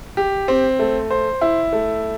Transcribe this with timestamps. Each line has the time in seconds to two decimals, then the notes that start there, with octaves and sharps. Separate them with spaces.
0.17 G4
0.48 C4
0.79 A3
1.11 C5
1.41 E4
1.73 A3